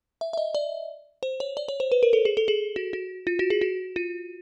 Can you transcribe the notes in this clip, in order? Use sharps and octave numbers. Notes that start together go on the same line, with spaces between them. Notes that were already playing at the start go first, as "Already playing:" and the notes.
E5
E5
D#5
D5
C5
C#5
D5
C#5
C5
B4
A#4
A4
G#4
A4
G#4
F#4
F#4
F4
F#4
G#4
F#4
F4